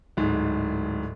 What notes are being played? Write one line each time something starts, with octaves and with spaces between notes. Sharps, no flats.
D1 G#2